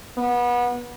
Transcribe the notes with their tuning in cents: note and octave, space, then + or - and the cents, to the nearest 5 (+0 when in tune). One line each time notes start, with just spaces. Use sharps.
B3 -25